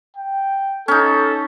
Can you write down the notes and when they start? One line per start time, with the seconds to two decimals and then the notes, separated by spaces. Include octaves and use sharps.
0.16 G5
0.88 C#4 D#4 A4